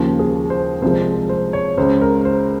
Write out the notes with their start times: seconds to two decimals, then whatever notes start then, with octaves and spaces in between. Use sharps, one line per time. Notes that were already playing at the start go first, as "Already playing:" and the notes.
Already playing: D#2 C#3 F3
0.19 G#4
0.50 C5
0.82 C2 C3 F3 G#3 C5
1.29 C5
1.53 C#5
1.77 C#2 C#3 G#3 C5
2.01 A#4
2.25 C5